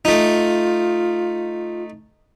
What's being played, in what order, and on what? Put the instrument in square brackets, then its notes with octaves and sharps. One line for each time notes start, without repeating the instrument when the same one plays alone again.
[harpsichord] A3 D#4 [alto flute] F4